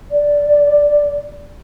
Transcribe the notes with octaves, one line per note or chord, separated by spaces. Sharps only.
D5